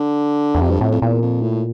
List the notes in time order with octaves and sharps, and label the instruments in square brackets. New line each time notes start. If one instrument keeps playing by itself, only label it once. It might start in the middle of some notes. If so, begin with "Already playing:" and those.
Already playing: [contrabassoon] D3
[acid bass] E2
[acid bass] F2 [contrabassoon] C3
[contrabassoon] G2
[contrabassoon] F2 [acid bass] A2
[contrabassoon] F2
[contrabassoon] E2 [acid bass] A#2
[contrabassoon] F2
A2